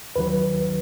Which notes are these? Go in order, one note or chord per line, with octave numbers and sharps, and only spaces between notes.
D#2 D#3 F#3 B4